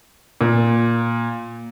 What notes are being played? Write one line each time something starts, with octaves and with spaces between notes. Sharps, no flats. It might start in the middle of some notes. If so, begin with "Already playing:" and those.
A#2